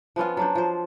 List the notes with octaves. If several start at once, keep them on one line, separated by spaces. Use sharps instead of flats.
F3 B3 C#4 F4
F#3 D4 C5
F3 C5